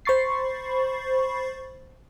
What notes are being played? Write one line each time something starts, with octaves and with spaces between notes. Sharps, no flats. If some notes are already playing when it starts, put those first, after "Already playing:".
C5 B5 C#6 A6 C7